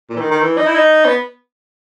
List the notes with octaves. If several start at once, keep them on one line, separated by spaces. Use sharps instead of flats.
A#2
E3
D#3
D#3
E3
D#4
E4
D#4
B3